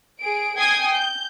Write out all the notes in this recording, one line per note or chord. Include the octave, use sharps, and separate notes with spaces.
G#4 D7
G5 G#5 D#6 G#6 C7
G6